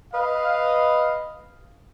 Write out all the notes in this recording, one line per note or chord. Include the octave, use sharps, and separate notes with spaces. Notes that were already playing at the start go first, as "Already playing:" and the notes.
B4 D#5 F5